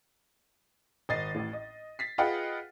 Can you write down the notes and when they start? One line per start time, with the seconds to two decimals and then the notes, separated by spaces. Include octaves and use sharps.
1.09 G#1 D#5 A6 C7 D#7
1.34 A1 A2
1.53 D#5
1.99 A6 B6 C7
2.18 F4 G#4 B4 D#5 F#5 G5